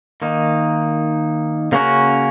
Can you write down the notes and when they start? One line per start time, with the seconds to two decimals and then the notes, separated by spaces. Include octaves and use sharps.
0.22 D#3 A#3 D#4
1.72 C#3 A#3 C#4 F#4 A#4